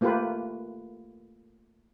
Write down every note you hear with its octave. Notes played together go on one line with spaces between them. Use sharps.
A3 A#3 F4 G4 B4